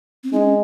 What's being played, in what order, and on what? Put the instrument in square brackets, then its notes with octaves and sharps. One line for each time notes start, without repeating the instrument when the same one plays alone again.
[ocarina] C4
[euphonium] G#3 [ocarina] C#4 D#4